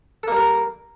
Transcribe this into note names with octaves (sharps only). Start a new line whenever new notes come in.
G3 A#3 A4 A#4